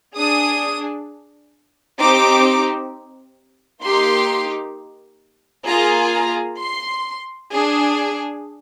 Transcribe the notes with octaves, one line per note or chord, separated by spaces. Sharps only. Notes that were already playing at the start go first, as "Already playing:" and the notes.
D4 G#4 D#6
C4 D#4 G4 D6
A#3 D#4 G4 C6
A#3 F4 G#4 A#5
A#5
C6
D4 G#4